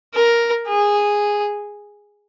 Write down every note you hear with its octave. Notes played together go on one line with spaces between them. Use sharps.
A#4
G#4